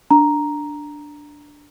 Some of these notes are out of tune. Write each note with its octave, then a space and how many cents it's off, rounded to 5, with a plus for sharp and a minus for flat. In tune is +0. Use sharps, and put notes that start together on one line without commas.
D4 +0 A#5 +0